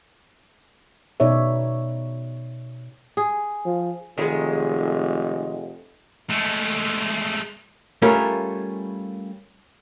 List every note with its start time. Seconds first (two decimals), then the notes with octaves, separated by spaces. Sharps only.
1.20 B2 D#4 G#4 C#5 D5 E5
3.17 G#4
3.66 F3
4.18 F1 D#3 G3 G#3
6.30 G#3 A3
8.02 G3 A3 C#4 F4 A#4